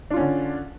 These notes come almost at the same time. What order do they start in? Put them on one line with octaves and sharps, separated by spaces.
D4 F4 C#4 D3